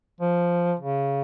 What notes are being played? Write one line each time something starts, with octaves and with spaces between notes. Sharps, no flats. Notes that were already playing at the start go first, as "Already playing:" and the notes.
F3
C#3